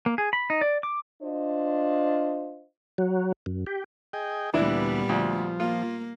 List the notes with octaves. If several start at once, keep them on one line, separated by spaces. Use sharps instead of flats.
A#3
G#4
B5
D#4
D5
D6
D4 F4 C5 D#5
F#3
F#2
G4
G#4 D#5 G5
D2 A#2 E3 G3 B3 D4 E4
D2 F3
A#3 F4